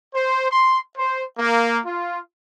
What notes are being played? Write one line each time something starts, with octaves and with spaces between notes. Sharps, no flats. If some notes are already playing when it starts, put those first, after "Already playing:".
C5
C6
C5
A#3
F4